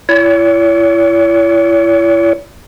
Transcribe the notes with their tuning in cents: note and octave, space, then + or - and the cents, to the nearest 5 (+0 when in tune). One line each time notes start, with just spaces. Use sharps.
E4 +35 C#5 +40